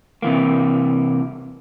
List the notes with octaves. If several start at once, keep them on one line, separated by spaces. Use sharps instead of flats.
C3 E3 A#3